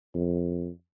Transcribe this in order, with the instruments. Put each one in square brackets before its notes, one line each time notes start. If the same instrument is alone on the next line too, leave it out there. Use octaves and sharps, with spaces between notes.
[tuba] F2